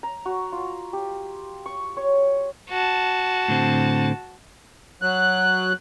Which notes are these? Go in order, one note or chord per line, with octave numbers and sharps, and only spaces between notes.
A#5
F#4
F4
G4
C#6
C#5
F#4 A5
A2 D3 C4
F#3 F#6